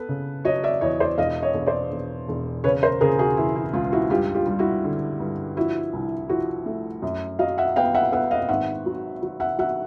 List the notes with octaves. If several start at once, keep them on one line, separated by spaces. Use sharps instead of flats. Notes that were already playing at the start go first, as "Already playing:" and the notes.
Already playing: B3 A4 B4
C#3
F#3 C#5 D#5
D5 E5
E2 C#5 D#5
C5 D5
E1 D#5 F5
C#5 D#5
E1
C5 D5
E1
E1
C#3 B4 C#5
A#4 C5
C#3 G#4 A#4
F#4 G#4
E3 E4
E4
C#2 F4
E4 F#4
G2 F4 G4
F4 G4
G3
E4 F#4
D3
G2
F3 E4 F#4
C2
F3 E4 F#4
A3
F#2
F#3 D#5 F5
E5 F#5
B3 F5 G5
E5 F#5
B3 E5 F#5
D#5 F5
G#1 E5 F#5
F#3
F#3
E5 F#5
F#3 E5 F#5